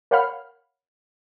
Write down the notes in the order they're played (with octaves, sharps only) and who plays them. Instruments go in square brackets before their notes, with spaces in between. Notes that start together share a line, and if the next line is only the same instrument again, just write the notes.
[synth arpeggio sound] A#4 C#5 F5 F#5 B5 F6